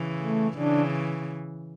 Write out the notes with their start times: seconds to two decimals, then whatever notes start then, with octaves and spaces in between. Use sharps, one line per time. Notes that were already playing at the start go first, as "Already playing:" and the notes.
Already playing: C#3 E3
0.22 A3
0.57 C#3 E3 D4